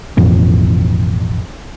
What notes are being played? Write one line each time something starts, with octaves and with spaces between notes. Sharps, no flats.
A1 F2 B2